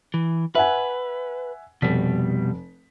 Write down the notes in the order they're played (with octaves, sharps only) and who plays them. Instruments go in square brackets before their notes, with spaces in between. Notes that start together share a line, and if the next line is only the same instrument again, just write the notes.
[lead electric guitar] E3
[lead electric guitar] B4 [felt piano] E5 F#5 G#5
[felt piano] F1 B6 [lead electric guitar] B2 G3